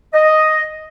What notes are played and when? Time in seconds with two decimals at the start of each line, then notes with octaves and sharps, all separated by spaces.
0.14 D#5